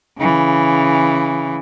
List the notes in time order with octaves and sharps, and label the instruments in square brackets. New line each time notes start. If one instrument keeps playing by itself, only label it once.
[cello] C#3 E3